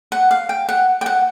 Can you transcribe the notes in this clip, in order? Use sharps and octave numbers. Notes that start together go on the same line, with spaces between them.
F#5
F5
G5
F#5
G5
F#5